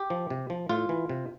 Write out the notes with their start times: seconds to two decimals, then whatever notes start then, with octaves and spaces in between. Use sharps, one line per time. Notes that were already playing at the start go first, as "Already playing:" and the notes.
Already playing: G4
0.10 F3
0.30 C3
0.50 F3
0.69 A2 F4
0.89 E3
1.09 C3